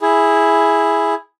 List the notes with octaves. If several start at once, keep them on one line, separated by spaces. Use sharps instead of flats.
E4 G#4